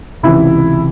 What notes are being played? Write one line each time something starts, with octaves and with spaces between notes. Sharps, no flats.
C#2 C3 E3 E4